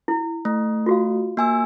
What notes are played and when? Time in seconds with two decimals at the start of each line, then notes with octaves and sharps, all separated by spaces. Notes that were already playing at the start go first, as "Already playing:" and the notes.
0.08 E4
0.45 A3
0.86 F4 F#4 F5
1.37 A#3 G#5 E6